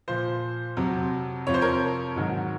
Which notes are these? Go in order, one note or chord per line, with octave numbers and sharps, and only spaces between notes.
A#2 F3 C5
F2 C3 F#3
F2 C3 F3 C#5
C5
A#4 C#5
G#2 D#3 F#3